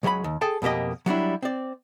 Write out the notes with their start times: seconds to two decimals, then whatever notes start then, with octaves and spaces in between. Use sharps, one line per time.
0.03 C#2 F#3 G#4 E5 B5
0.24 D#2
0.41 G#4 A4 G5 A5
0.62 F2 B2 A#3 G4 D#5
1.06 F#3 G3 D4 E4
1.42 C4 D5